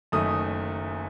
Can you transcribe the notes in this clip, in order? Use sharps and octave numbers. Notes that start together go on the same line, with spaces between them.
F#1 F#2 D#3 A3 D#6